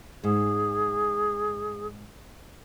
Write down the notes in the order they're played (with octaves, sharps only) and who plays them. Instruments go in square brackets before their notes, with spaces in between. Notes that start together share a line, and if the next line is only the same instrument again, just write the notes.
[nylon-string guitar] G#2 [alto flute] G#4